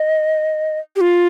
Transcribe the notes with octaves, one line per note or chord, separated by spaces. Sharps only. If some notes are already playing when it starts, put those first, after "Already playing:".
Already playing: D#5
G4
F4